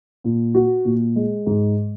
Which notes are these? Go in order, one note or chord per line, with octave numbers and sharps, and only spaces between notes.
A#2
F#4
A#2
G#3
G#2